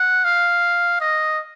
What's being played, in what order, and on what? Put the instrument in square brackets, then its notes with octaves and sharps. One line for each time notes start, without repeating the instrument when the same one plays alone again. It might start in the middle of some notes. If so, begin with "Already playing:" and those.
Already playing: [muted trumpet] F#5
F5
D#5